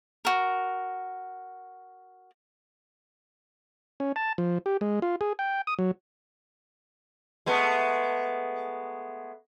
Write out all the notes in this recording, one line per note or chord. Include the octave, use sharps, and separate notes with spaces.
F#4 A#4
C#4
A5
F3
G4
G#3
F4
G#4
G5
D#6
F#3
G#3 A3 B3